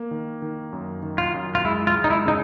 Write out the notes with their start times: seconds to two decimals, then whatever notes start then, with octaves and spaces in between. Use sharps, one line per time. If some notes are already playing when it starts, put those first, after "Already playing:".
Already playing: A#3
0.11 D#3
0.42 D#3
0.73 F#2
1.03 D#3
1.18 F4
1.34 F#2
1.55 F4
1.65 G#3 E4
1.87 F4
1.94 G#3
2.04 D#4
2.10 E4
2.26 C#3 D#4